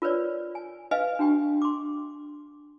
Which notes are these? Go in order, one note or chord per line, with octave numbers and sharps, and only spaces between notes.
F4 A#4 B4 C#5 D5
G#5
B4 D#5 F5 G#5
D4 F#4 G5 C#6
C6 D6